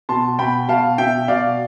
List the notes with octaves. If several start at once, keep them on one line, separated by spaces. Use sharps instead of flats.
B2 A5 C6
B2 G5 B5
B2 F5 A5
B2 E5 G5
B2 D5 F5